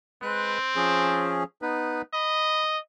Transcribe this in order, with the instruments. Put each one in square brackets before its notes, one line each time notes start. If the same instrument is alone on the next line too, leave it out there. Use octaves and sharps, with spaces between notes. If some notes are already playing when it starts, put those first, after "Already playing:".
[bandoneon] G#3 B4 F#6 [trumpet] C4
[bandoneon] F3 C#4 G#4
B3 D#4 B4
[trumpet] D#5 [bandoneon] B5